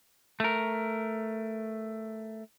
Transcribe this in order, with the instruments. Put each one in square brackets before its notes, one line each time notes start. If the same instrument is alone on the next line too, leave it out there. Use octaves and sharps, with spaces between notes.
[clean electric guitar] A3 A#4